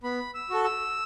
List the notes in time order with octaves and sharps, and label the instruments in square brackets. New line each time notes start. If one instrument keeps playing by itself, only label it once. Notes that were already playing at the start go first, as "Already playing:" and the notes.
[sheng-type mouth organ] B3 B5
E6
F#4 A4
E6